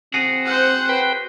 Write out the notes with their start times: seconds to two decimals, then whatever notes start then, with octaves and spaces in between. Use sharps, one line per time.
0.14 C4 F#4 G#4
0.45 C5 F#5
0.89 B4 G5